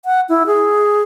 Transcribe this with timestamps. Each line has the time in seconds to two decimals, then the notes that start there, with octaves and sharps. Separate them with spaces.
0.05 F#5
0.29 E4
0.46 G#4